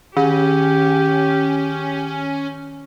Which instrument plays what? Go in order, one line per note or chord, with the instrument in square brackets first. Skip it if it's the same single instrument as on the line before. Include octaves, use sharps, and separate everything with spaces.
[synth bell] D#3 [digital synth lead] C#4 [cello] G4